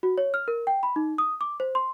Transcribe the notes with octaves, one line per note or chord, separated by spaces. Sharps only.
F#4
C#5
F6
A#4
G5
B5
D#4
D#6
D6
C5
C6